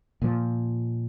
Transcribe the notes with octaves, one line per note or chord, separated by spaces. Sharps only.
A#2 F3